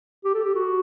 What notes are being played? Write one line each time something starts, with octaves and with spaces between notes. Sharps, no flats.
G4
A4
G4
F#4